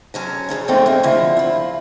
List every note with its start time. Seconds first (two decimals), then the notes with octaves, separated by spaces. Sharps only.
0.14 D3 F#3 C#4
0.49 A#2 C#3 E3 F3
0.68 F2 G#2 D3 A3 C4 D#4
0.86 A#3 E5
1.03 D3 F3 C4 E4 A#4
1.37 E4 F4